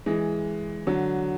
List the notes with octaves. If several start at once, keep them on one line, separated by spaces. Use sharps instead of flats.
E3 G#3
D3 F#3